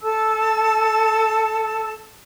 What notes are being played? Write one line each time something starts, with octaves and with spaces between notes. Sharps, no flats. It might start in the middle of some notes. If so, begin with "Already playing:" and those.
A4 A5 E6